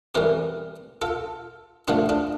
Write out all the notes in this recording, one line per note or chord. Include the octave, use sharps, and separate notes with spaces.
F2 E3 G3 G4 A#4
F4 A4
G2 D3 F3 A3 D4 F4
D4 F4